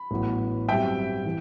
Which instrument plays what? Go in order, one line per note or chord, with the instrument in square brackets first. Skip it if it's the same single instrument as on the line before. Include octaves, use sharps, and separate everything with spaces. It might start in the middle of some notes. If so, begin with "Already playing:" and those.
Already playing: [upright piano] B5
[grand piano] A1 A2 F#3 B3
[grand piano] G2 F#3 C4 G4 [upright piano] E5 G5
[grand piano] E3